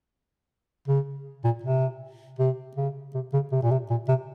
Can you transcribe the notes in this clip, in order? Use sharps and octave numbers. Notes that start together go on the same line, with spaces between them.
C#3
A#2
C3
C3
C#3
C3
C#3
C3
A#2
C3
A#2
C3